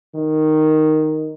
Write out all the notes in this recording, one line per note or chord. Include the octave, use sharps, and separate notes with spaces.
D#3